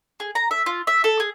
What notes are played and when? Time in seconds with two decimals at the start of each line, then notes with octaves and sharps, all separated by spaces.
0.20 G#4
0.35 A#5
0.51 E5
0.66 F4
0.87 E5
1.04 A4
1.20 G#4